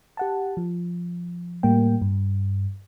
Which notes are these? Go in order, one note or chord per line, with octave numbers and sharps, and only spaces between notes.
G4 F#5 A5
F3
A2 G3 A#3 G5
G2